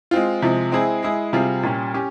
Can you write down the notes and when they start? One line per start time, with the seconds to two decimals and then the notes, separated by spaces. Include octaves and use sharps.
0.11 G#3 C4 F4
0.42 C3 F3 G#3
0.72 G#3 C4 E4 G#4
1.03 G#3 E4 G#4
1.33 C3 G3 C4 F4 G#4
1.63 A#2 G3 C#4
1.94 C#4 G4